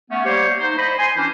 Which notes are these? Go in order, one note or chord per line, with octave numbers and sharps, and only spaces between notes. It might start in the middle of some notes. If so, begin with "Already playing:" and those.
A3 B3 C#4
G3 A#3 G4 C5 C#5
D#4 C5
C5 D#5 B5
G#5 C6
E3 C#4 D4 E4 G4 C5